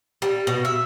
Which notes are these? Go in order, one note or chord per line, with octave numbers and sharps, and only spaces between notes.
G3
B2
E5